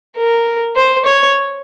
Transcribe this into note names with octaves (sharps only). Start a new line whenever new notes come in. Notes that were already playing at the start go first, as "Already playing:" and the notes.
A#4
C5
C#5